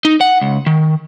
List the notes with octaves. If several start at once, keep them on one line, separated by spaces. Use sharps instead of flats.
D#4
F#5
C#2
D#3